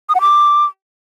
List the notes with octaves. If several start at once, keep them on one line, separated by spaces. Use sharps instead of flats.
D#6
F#5
D6